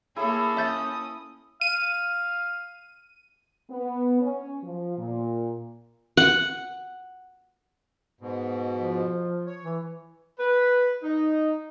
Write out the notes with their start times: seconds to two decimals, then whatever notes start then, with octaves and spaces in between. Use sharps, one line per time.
0.16 A#3 E4 G#4 A4 C#5 B5
0.57 C#4 E5 D#6 G6 A6
1.61 F5 D#7
3.70 B3
4.21 C#4
4.63 F3
4.97 A#2
6.17 F#5
8.21 G#2 B2
8.75 F3
9.47 C#5
9.64 E3
10.39 B4
11.03 D#4